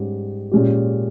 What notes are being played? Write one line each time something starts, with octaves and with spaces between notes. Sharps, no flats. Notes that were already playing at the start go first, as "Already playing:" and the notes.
Already playing: G#2 G3 C#4 G4
A#2 G#3 C#4 G4